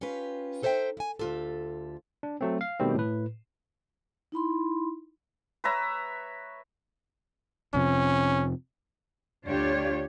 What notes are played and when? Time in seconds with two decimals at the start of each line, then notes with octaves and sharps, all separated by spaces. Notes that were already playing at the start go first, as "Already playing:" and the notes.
0.01 C#4 F4 G4 B4
0.62 D#4 A4 C5 C#5 E5 G5
0.97 E4 G#5
1.19 D2 F3 F4 G4 A4
2.23 D4
2.41 F#3 A3 C4
2.61 F5
2.80 B2 D#3 G3 A3 C4
2.95 A2 B4
4.32 D#4 E4 B5 C6
5.64 B4 C#5 E5 A#5
7.74 F2 C3 F3 C#4
9.46 D2 D4 F4 G4 C#5